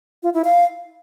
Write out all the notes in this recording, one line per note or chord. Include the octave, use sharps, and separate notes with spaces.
F4
E4
F5